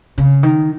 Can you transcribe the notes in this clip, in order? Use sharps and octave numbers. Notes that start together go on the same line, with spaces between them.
C#3
D#3